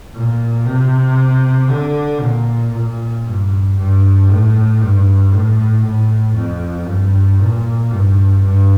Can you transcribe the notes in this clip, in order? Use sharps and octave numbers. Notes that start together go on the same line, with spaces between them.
A#2
C3
D3
A#2
A#2
G2
G2
A2
G2
A2
A2
F2
G2
A#2
G2
G2